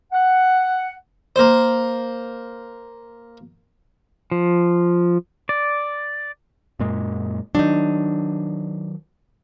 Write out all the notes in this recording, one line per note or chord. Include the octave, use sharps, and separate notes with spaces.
F#5
A#3 C5
F3
D5
F#2 A#2 G#3
D#3 F#3 D4 D#4